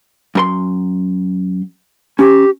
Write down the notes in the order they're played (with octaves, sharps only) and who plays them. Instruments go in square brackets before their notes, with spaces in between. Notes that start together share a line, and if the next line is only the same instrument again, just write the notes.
[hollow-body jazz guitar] F#2 A#4 C6
[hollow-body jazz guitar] C#4 [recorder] G4